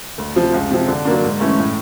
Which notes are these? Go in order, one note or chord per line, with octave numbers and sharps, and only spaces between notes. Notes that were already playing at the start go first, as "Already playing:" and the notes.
D2
C3 F3
C#2
C3 F3
D3
F#3 A#3 D4
G#2
E3 A3 C#4
A2